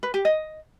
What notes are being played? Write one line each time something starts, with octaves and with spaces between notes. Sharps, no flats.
B4
G4
D#5